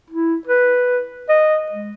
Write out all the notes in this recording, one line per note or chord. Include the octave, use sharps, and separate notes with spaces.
E4
B4
D#5
G#3